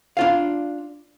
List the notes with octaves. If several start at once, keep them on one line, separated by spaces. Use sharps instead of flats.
D4 F4 F5